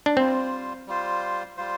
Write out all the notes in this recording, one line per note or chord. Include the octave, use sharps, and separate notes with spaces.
D4
G3 C4 F4 C5
G3 F4 C5
G3 F4 C5